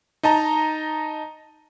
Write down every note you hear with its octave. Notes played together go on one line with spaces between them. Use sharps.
D#4 D#5 A5 A#5